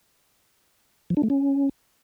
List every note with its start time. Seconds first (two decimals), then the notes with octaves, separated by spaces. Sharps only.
1.10 F3
1.17 D4
1.23 A3
1.30 C#4